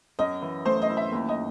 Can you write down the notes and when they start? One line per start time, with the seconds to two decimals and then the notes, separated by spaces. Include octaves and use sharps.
0.19 F#2 D#5
0.42 E3
0.66 A3 C5
0.82 D#5
0.89 E4
0.97 E5
1.12 D#2
1.29 D#5